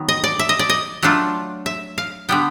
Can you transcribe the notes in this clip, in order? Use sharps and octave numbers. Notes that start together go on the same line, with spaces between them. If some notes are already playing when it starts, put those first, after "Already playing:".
Already playing: D#3 F#3 B3
D#5
D5
E5
D#5
D5
D#5
F#3 A3 D4 F4
E5
F5
D3 G3 B3 G5